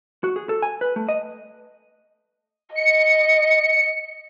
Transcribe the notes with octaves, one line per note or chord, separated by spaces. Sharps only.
F#4
G#4
A4
G#5
B4
A3
D#5
D#5 C#7